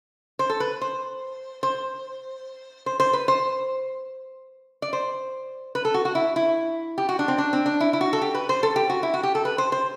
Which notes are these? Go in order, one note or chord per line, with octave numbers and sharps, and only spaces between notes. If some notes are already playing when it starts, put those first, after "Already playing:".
C5
A4
B4
C5
C5
C5
C5
B4
C5
D5
C5
B4
A4
F#4
F#4
E4
E4
G4
F#4
D4
C4
D4
C4
D4
E4
E4
F#4
A4
G4
B4
C5
A4
G4
F#4
E4
F#4
G4
A4
B4
C5
C5